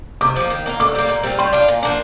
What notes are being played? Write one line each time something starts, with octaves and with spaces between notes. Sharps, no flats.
C3 D6
F3 A#3
D#3
A#3 D4 F4
D3 D6
G3 A#3
A#2
G3 C4 F4
G3 C6
D4 F4
A#2
F3 A#3 D4